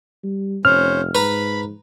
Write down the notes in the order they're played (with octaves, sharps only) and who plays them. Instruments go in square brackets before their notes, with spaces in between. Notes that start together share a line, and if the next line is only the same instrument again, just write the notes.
[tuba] G3
[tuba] F1 [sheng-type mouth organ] C#4 C5 [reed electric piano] F6
[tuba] G#2 [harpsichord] B4 A#5 [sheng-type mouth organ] B5